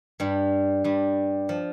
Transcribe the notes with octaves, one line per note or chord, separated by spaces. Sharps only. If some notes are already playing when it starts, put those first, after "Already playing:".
G2 G3
G2 G3
F3